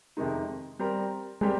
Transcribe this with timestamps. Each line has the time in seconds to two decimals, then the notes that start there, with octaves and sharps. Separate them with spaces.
0.17 F2 C3 D#3 G#3 D#4
0.79 G3 C4 G4 A#4
1.41 G3 G#3 C4 G4 A#4